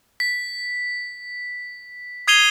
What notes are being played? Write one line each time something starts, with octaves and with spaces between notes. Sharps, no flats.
B6
D#6 G#6 C7 D#7 F7 G7